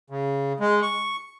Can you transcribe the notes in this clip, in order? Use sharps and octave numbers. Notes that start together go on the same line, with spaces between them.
C#3
G#3
C#6